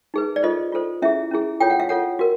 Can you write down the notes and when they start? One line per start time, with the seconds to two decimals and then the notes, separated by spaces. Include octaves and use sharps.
0.14 D#4 G#4 B4
0.36 D5
0.43 F4 A4 C5 D#5
0.72 F4 A4 C5
1.02 C#4 E4 G#4 E5
1.31 C#4 E4 G#4
1.60 F4 A4 C#5 G5
1.70 F#5
1.80 F5
1.89 F4 A4 C#5 F#5
2.19 F#4 A#4